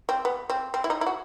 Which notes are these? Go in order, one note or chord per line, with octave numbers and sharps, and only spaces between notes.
C4
B3
C4
C4
E4
D#4
E4
F#4